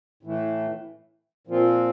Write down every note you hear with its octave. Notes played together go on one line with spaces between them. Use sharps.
A2 E3 A3
A#2 F3 C4 F4